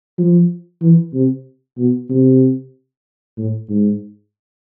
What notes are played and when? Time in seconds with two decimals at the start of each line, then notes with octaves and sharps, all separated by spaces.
0.18 F3
0.82 E3
1.14 C3
1.78 B2
2.10 C3
3.38 A2
3.69 G#2